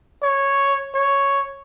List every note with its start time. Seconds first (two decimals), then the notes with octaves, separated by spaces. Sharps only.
0.22 C#5
0.95 C#5